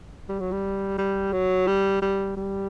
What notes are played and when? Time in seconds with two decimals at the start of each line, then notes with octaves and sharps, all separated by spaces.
0.29 G3
0.40 F#3
0.52 G3
0.98 G3
1.33 F#3
1.67 G3
2.02 G3
2.37 G3